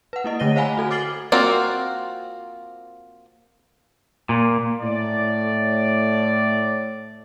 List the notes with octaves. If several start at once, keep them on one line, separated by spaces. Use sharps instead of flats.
B4 F#5
A#3 E4 D#5
D3 A3 C#5 A#6 D#7 G7
C5 F5 F#5 G#5 A#5 B5
F#4 A4 G#5
D6 F6 A6 C7 F#7 G7
A#3 C4 F4 F#4
A#2
A2 D5